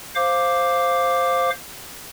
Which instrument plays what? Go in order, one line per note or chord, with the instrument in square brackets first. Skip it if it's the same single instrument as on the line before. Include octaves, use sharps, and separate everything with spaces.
[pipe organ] C5 F5 D6